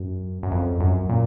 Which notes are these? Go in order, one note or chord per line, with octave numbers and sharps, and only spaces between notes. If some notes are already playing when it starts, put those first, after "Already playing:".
Already playing: F#2
F#2
F2
F#2
A#2